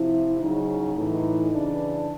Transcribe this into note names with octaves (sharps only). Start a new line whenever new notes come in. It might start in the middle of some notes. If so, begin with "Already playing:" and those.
Already playing: C3 F3 E4
C#3 F#3 D#4
A2 E3
C#3 E3 D4